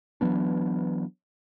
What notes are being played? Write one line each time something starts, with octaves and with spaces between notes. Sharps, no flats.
E3 F#3 B3 D4